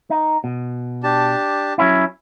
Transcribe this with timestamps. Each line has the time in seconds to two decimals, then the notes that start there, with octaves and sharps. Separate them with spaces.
0.10 D#4
0.44 B2
1.03 D4 G4 A5
1.78 F#3 C#4 E4